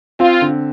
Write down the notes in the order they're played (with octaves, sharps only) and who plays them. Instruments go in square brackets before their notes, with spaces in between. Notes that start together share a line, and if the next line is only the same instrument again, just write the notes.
[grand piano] C4 [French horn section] F4
[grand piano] D3